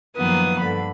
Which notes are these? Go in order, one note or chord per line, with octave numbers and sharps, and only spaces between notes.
F#2 D#3 F3 A#3 B3 D#6
G2 D3 B5